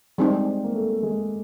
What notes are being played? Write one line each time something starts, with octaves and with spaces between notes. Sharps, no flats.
G3 G#3 C4 D#4
A#3
A3
G#3